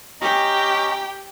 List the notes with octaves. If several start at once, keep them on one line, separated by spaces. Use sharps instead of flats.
C#4 G4 D#5 G5 A#5